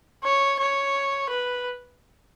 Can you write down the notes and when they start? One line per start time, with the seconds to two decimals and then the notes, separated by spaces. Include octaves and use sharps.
0.23 C#5
0.59 C#5
1.29 B4